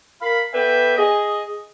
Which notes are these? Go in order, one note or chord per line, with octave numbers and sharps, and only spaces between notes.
A#4 F5 B5
B3 A4 B4 D5 E5 G5
G#4 D#5